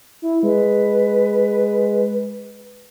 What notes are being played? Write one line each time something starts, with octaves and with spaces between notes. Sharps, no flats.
E4
G#3 B4